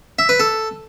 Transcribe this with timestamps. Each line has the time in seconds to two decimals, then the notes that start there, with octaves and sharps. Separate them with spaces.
0.19 E5
0.29 B4
0.40 A4